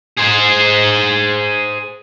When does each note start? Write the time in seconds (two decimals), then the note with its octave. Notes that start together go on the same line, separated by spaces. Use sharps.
0.18 G#4 C5